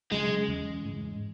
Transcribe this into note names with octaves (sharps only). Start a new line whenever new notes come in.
C#3 F#3 G#3 C#4
E2 C#3 G#3
G#2 E3 G#3